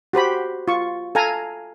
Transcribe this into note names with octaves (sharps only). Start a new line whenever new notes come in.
F#4 G4 C5 B5
F4 C#6
A4 F5 G#5 A#5